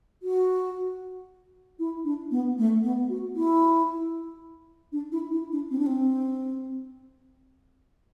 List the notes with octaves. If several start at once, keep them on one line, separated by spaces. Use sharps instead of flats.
F#4
E4
D4
B3
A3
B3
F#4
E4
D4
E4
E4
D4
C4
D4
C4